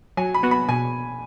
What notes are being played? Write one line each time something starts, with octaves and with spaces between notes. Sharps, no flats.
F#3 G#5
B5
B3 F#4
B5
B2 G#5